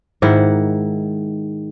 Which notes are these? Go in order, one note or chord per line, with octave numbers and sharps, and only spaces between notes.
G#2 D#3 E4 F#5